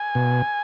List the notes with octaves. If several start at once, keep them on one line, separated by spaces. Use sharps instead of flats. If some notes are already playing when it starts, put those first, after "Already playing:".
Already playing: G#5
B2